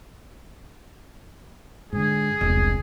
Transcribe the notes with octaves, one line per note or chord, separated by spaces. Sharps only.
G#2 D3 G#4
E1 C2